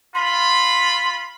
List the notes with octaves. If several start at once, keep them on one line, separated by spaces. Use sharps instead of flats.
F4 B5 C6